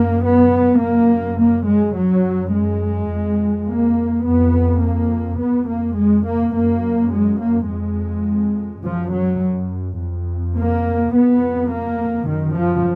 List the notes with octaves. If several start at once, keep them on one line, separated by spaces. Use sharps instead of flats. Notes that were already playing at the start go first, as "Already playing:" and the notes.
Already playing: F#2 A#3
B3
F#2 A#3
A#3
G#3
F#2 F#3
G#3
F2
A#3
F2 B3
A#3
F2 B3
A#3
G#3
A#3
F#2 A#3
G#3
A#3
F2 G#3
F#2 F3
F#3
F2
A#3
F2 B3
A#3
F#2 D#3
F3